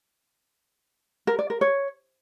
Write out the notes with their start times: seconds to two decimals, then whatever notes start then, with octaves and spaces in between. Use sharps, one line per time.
1.27 A#4
1.39 D5
1.50 A#4
1.61 C#5